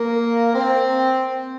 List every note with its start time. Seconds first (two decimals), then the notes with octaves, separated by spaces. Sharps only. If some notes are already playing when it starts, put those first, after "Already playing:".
Already playing: A#3
0.53 C4